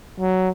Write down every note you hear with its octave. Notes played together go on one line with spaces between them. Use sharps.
F#3